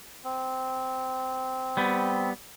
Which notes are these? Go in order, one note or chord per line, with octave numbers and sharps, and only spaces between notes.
C4
G3 B3